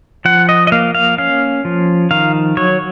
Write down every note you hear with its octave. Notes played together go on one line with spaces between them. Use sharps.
F3 F#5
D#5
D#5
A#3 F5
F5
C#4 F5
F3
D#3 F5
F#3 C#5